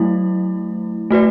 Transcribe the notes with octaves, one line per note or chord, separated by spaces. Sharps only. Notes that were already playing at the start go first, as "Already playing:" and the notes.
Already playing: F#3 A3 E4
A3 F#4 B4 D5